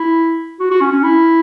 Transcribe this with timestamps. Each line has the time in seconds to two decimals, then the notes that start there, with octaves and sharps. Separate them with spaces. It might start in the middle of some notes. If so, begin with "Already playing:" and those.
Already playing: E4
0.60 F#4
0.71 F#4
0.81 C#4
0.92 C#4
1.03 E4